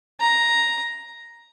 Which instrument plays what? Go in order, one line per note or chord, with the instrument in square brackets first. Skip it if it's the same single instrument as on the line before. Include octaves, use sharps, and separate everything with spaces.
[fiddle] A#5